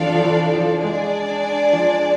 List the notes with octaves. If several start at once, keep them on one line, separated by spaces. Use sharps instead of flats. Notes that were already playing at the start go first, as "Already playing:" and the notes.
Already playing: C3 E3 F3 D4 A4 D5 F5
F3
E3
F3
G#3 D4 G#4 D5
F3